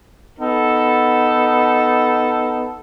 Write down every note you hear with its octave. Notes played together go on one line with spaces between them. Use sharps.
B3 D#4 A4